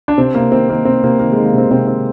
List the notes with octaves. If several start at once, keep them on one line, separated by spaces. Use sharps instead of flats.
D4
C3 C4
C3 A#3
D#3 C4
D#3 A#3
C3 C4
C3 A#3
D#3 A#3
D#3 G#3
A#3
C3 C4
C3 C4
D#3 C4